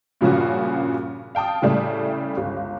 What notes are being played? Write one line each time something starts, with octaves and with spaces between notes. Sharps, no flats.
G2 A#2 C#3 F3 C#4 F#4
F5 G5 A5 D#6
A2 C#3 G3 A3
G1 C#2